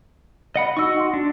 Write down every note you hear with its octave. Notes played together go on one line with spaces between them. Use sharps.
D#5 F#5 B5
D#4 F#4 D#5 C#6 E6
F#5 C6
D4